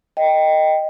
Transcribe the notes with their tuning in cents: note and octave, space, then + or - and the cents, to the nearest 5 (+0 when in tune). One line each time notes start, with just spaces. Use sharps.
D#5 +0 G5 +0